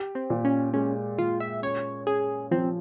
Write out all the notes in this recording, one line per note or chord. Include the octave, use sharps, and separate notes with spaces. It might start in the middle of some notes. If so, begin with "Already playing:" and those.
Already playing: G4
C4
A#2
C#4
G#3 C#4
A#2 F4
E5
C#4 C#5
C#4 G#4
F3 C4